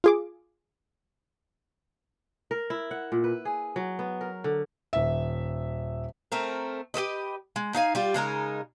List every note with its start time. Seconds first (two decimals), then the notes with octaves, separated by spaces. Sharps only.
0.04 F4 G#4 D6
2.51 A#4
2.70 E4
2.91 F#5
3.12 A#2
3.24 B4
3.45 G#4
3.76 F#3
3.99 B3
4.21 A#4
4.44 D3
4.93 D#1 E5
6.32 A3 C4 A#4
6.94 G4 A4 B4 D#5
7.56 G#3
7.75 D#4 F5 G#5
7.95 G3 F4 G4
8.14 C#3 G#3 D#4 A#4